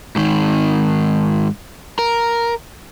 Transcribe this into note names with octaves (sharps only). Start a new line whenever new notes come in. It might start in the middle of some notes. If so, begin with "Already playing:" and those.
G#2 D#3
A#4